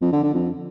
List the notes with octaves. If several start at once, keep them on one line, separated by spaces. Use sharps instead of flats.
F2
D3
D3
F2